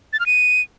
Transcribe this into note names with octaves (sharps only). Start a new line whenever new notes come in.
A6
F6
D#7